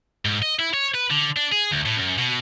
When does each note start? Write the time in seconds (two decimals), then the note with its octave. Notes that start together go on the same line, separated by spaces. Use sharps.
0.25 G#2
0.42 D#5
0.59 E4
0.74 C#5
0.94 B4
1.10 D3
1.37 D4
1.52 G#4
1.71 D2
1.86 A2
1.97 F#2
2.18 B2